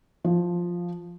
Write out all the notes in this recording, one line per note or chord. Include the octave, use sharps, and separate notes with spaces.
F3